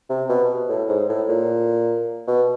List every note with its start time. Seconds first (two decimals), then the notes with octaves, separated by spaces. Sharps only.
0.10 C3
0.29 B2
0.69 A2
0.89 G#2
1.09 A2
1.29 A#2
2.27 B2